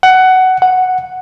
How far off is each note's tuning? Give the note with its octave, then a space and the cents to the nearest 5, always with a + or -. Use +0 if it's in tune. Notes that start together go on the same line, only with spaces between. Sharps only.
F#5 +15
F#5 +0